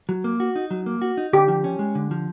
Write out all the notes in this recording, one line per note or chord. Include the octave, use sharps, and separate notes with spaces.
F#3
A#3
F#4
D#4
F#3
A#3
F#4
D#4
D3 G4
F3
C#4
G#3
D3
F3